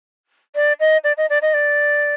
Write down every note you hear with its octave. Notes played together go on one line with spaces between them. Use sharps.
D5
D#5
D5
D#5
D5
D#5
D5